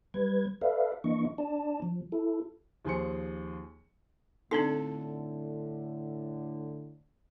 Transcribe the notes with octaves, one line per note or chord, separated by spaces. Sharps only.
G3 B4 G#6
A4 B4 D5 E5 F5
E3 A#3 D4 D#5 C#6
D4 D5 A5
F3
E4 A4
D#2 F3 G#4 G#5 C6 C#7
A2 D3 C4 D4 D#4 A4